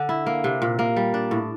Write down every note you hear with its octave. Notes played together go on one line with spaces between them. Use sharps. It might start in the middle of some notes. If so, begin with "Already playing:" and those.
Already playing: D3
E4
A#3
C3
A#2
A#3
G3
D4
A2